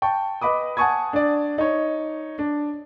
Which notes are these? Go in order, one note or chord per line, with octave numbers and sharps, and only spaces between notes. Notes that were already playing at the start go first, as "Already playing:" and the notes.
G5 A5 C#6
B4 D#5 B5 D6 D#6
F#5 G#5 A5 C#6 D#6 G#6
D4 D5
D#4 C#5
D4